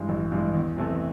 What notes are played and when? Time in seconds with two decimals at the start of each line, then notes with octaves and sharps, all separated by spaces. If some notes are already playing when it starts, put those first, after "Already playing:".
Already playing: G2 E3 G#3
0.09 A1
0.32 G2 E3 G#3
0.54 E2
0.77 C3 E3 A3